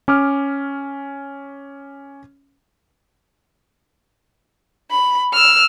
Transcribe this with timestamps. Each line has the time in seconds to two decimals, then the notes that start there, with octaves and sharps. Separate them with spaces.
0.08 C#4 D6 F6
4.91 B5
5.33 E6 F6